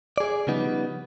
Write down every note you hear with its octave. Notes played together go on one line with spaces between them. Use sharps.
G#4 D5
C#3 F3 G3 B3 D#4